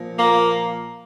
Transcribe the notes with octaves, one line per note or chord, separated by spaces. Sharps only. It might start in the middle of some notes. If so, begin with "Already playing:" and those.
Already playing: A#2 F3
A#3